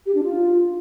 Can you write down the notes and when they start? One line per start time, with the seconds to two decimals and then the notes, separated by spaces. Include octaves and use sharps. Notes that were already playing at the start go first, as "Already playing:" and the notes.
0.06 G4
0.15 D4
0.24 F4